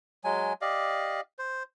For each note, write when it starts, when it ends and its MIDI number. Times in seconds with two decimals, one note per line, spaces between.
0.24 0.53 54
0.24 0.53 56
0.24 0.53 80
0.61 1.21 67
0.61 1.21 74
0.61 1.21 75
0.61 1.21 77
1.39 1.63 72